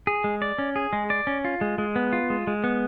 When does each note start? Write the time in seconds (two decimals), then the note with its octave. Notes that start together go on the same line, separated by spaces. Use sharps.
0.07 G#4
0.24 G#3
0.42 D5
0.58 C#4
0.76 G#4
0.93 G#3
1.10 D5
1.27 C#4
1.45 F4
1.61 G#3
1.78 G#3
1.96 B3
2.13 F4
2.30 G#3
2.47 G#3
2.64 B3